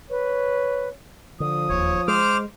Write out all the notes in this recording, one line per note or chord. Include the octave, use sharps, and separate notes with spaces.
B4 C#5
D3 F3 D#6
E1 D#2 C#5
G#3 C5 D6 F6